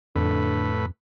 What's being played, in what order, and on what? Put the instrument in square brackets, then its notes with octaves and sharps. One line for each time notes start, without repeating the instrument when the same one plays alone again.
[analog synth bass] F2 [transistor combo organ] A2 B4 [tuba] D3